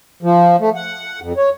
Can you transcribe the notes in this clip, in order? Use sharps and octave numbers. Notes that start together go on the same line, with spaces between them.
F3
A3
F#5
F2
C#5